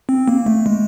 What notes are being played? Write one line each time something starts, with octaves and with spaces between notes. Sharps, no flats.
C4
A#3
A3
G#3